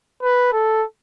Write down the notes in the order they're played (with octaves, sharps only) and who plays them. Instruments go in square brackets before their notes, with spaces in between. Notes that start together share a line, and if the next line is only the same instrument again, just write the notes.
[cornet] B4
A4